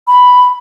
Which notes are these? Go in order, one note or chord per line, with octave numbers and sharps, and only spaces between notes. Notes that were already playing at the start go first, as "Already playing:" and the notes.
B5